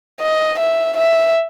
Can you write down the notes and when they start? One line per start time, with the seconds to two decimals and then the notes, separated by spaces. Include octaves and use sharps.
0.21 D#5
0.59 E5
0.97 E5